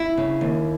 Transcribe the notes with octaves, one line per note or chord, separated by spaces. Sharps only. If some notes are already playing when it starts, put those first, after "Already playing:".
Already playing: E4
C#3
D#2